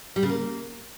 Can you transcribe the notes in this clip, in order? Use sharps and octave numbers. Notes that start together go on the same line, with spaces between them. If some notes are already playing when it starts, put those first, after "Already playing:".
G3
C#3
A#3